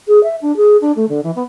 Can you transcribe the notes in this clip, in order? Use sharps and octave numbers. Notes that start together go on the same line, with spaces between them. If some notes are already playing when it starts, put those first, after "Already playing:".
G#4
E5
D4
G#4
D4
A3
D3
E3
B3